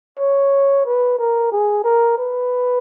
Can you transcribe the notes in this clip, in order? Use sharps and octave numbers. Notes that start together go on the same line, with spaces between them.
C#5
B4
A#4
G#4
A#4
B4